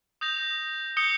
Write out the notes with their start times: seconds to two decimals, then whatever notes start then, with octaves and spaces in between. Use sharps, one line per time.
0.21 D#6 G6 A#6 F7
0.97 D#6 G6 C#7 G7